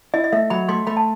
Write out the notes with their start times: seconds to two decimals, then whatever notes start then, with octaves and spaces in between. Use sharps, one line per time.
0.14 E4 D#5
0.24 D#5
0.32 A3 E5
0.50 F#3 B5
0.68 A3 C6
0.87 A3 B5
0.97 A5